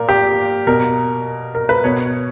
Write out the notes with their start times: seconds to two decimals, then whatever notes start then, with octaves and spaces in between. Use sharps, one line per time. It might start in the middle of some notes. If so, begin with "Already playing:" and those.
Already playing: A#2 A#4
0.09 G4
0.67 B2 A#4
1.55 A#4
1.69 B4
1.84 B2 C#5